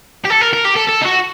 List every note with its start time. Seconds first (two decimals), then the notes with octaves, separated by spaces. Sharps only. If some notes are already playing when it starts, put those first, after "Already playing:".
0.25 G4
0.30 A4
0.41 A#4
0.53 A#4
0.65 G4
0.76 A4
0.89 A4
1.02 D#4
1.06 F#4